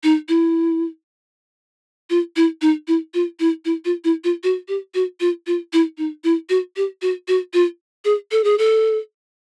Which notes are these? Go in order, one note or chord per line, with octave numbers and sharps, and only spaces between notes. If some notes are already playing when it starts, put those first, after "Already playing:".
D#4
E4
F4
E4
D#4
E4
F4
E4
E4
F4
E4
F4
F#4
G4
F#4
F4
F4
E4
D#4
E4
F#4
G4
F#4
F#4
F4
G#4
A4
G#4
A4